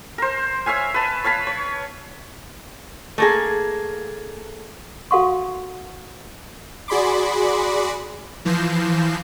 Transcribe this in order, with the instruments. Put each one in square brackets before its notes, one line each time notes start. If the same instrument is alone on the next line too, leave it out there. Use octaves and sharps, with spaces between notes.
[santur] A#4 C5
C#5 E5 F5 G#5
B4 A5
C#5 F5 A5 B5
C#5
[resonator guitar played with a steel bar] A3 A#3 G#4
[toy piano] F#4 A4 F5 F#5 C6 C#6
[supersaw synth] F#4 G#4 D5 B5 C6 D6
E3 F3 G6 A#6 C7 E7